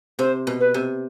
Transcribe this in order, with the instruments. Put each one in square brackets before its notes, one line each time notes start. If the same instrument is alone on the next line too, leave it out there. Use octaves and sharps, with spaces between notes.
[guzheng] C3 [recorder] C5
[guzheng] B2
[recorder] B4
[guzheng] C3